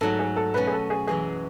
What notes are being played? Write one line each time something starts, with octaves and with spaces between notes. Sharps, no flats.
G#2 F#3 A3 A4
G#4
A4
B2 A3 C#4 B4
G#4
A4
G#4
F#2 E3 G#3 G#4